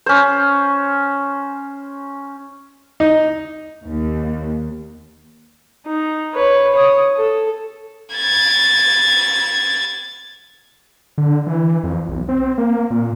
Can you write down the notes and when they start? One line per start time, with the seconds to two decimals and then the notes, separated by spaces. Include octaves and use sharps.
0.06 C#4 C5
3.00 D#4
3.87 D#2
5.86 D#4
6.34 B4 C#5
6.73 C#5 D#6
7.17 A4
8.15 G#6 A6
11.18 D3
11.47 E3
11.83 F2
12.08 B1
12.29 C4
12.58 A#3
12.91 A#2